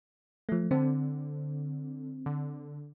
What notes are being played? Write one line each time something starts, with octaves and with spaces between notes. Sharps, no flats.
F3 A3
D3 C4
D3